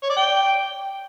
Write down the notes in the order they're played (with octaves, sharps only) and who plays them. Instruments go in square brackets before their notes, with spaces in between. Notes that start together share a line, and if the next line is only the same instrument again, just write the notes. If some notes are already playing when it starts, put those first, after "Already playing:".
[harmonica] C#5
D5
G5